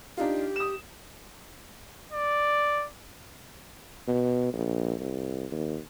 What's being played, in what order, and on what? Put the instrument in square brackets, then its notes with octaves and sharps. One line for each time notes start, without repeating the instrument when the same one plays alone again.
[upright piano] D4 D#4 F4 [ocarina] G4
[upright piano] D#6 E7
[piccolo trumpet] D5
[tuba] B2
A#1
C2
D#2